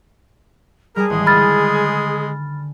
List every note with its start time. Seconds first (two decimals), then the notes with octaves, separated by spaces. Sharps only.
0.96 G3 G#4 A#4 A5
1.10 A1 D#3 G#3
1.27 D3 G#5 B5 F6 A6